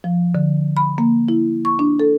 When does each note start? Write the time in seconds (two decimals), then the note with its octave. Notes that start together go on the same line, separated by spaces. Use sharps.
0.04 F3
0.35 D3
0.77 B5
0.98 A#3
1.28 E4
1.65 C#6
1.79 D4
2.00 A4